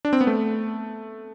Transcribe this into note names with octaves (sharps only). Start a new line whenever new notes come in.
D4
C4
B3
A3